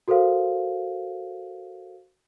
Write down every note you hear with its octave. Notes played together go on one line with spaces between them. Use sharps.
F#4 A4 A#4 C5 F5